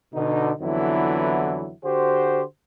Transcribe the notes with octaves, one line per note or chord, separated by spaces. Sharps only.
B2 D3 D#4
F2 D3 E3 F#3 B3 E4
D3 F#4 G4 C5